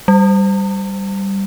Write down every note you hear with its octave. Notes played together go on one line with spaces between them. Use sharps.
G3